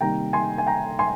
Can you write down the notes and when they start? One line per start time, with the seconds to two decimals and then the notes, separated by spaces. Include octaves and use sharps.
0.01 C3 D#3 G3 A#3 G5 A#5
0.33 G#5 C6
0.58 G#5
0.67 G5 A#5
0.99 G#5 C6